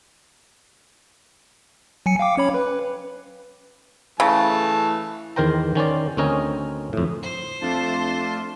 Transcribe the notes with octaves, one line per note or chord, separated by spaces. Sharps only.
F#3 G#5 C#7
F5 G5 D6
C#4 C#5 B5
B4
C#3 E3 A3 A5
E2 D#3 A#4 C5 G5 A#5
D#3 C#4 C5 D5
D2 C4 C#4 A#4 D#5 G#5
F2 A2
C5
F2 A3 D4 F4 A5 C6